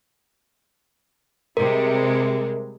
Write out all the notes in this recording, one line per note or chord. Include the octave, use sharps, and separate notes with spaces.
C3 G3 G#3 A#4